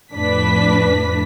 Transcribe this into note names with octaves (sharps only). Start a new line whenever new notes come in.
F2 A2 D4 B4 B6